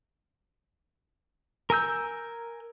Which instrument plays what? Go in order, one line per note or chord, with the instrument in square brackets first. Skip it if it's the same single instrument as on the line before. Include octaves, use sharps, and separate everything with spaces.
[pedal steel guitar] A#4 G#5 E6 G6